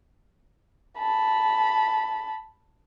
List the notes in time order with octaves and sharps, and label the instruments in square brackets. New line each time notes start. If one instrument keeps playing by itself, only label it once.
[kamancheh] A5 B5